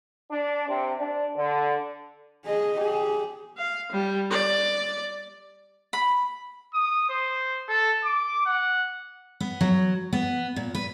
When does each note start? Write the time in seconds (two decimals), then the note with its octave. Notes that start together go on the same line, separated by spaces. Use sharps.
0.30 D4
0.68 C3
1.00 D4
1.37 D3
2.45 G#4 D#5
2.77 G4 G#4
3.58 F5
3.92 G3
4.31 D5
5.93 B5
6.74 D#6
7.09 C5
7.69 A4
8.04 D6
8.46 F#5
9.40 B3
9.61 F#3
10.13 B3
10.56 A#2
10.75 B4